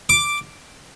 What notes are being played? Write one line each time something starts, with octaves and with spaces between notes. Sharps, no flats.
D6